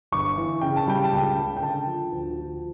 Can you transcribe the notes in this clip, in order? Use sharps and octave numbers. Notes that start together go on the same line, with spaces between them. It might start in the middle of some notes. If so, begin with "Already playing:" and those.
G1 C#6
E3
C#3 G5
A5
G3 G5
A5
C#2 G5
C#3
G5
D3 A5
F3
D2
F3